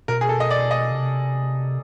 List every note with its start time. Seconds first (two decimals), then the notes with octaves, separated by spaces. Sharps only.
0.08 B2 A#4
0.21 G#4
0.29 A4
0.40 D#5
0.51 D5
0.71 D#5
0.91 C3